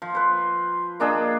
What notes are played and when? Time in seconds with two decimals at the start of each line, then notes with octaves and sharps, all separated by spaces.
0.02 F3
0.15 B4 C5
1.00 A#3 D4 G#4 D#5